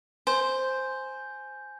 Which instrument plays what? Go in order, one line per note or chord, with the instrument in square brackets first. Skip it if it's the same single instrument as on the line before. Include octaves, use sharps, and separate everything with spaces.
[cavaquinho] C5 [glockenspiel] G#5 G6